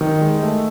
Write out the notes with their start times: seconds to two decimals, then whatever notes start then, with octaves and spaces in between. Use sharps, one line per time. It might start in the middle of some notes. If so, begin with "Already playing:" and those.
0.01 D#3
0.21 G#3
0.42 A3